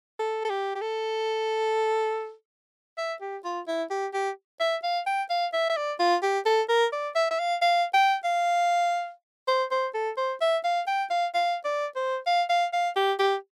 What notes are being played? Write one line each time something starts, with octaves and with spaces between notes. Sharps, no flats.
A4
A4
G4
G4
A4
E5
G4
F4
E4
G4
G4
E5
F5
G5
F5
E5
E5
D5
F4
G4
A4
A#4
D5
E5
E5
F5
F5
G5
F5
C5
C5
A4
C5
E5
F5
G5
F5
F5
D5
C5
F5
F5
F5
G4
G4